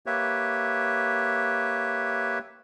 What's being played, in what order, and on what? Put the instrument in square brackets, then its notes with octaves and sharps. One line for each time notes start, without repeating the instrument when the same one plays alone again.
[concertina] A#3 G4 B4 C#5 E5